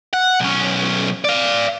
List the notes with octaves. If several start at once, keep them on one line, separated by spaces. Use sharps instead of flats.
F#5
B1 C#4
D5 F5